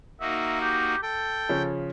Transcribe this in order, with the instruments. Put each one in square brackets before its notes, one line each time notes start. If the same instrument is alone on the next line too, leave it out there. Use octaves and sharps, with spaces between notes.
[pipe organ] A#3 D#4 F#4 [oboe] E5
[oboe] G4
[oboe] A4 [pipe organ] G5
[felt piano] C#3 F3 C#4